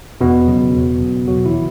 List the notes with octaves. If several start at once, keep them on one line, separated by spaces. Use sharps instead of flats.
E2 B2 B3
C#3 F#3
E2
C#3 F#3
E2 F#3 F#4
E3 E4
C#3